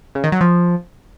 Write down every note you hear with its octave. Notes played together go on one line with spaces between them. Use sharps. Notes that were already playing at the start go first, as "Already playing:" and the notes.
C#3
D#3
F#3
F3